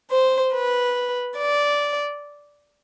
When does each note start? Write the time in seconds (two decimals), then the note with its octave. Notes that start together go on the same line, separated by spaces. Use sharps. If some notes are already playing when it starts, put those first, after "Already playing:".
0.11 C5
0.54 B4
1.38 D5